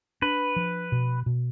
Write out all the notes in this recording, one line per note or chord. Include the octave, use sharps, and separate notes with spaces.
D4 B4
F3
B2
B2